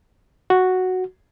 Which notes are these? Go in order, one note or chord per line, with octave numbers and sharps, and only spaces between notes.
F#4